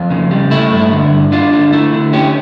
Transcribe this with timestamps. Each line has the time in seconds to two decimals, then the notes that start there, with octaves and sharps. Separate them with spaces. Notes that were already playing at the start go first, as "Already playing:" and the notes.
Already playing: F2 F4
0.10 C#3
0.31 G3
0.51 A3 E4
0.71 G2
0.92 D3
1.12 G2
1.32 D4 F4
1.52 D3 F4
1.73 A3 E4
1.93 D3
2.13 C#4 G4